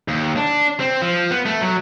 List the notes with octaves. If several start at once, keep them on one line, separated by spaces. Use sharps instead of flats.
D#2
D4
C4
F3
B3
A3
F#3